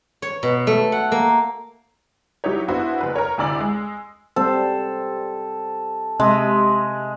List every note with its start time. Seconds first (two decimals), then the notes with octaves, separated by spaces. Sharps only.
0.22 C#5
0.43 B2
0.67 A3
0.92 F#5
1.12 A#3
2.44 F#3 D#4 E4 G4 C#5
2.68 B3 D4 E4 F#4 C5
3.01 F#1 B4
3.16 A#4 C#5
3.38 F1 D2 E4 D5 E6 F#7
3.60 G#3
4.36 G3 C4 A4 C5
6.20 C3 G#3 D#5 E5